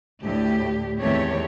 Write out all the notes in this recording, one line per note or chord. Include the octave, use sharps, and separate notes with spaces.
D2 A2 G4
E2 D#3 A3 C4 G4 C#5